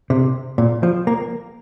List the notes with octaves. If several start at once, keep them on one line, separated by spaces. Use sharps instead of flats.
C3
A#2
F3
A#3